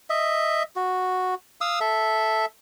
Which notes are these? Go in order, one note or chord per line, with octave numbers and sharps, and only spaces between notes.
D#5 E5
F#4
F5 D#6 E6
A4 E5